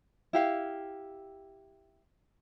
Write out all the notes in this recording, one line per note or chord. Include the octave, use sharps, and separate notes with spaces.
E4 G4 F5